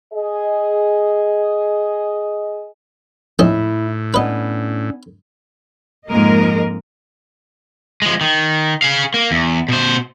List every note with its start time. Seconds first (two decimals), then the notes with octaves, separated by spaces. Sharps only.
0.13 G#4 D#5
3.39 A#1 A2 C#4 E4 D#5
4.14 B3 C#4 D4 B4 D#5
6.08 F2 G#2 G#3 A#3 A#4 D#5
8.02 F3 G#3
8.21 D#3
8.82 G#4 F5
9.14 A#3
9.31 E2
9.69 B2 C5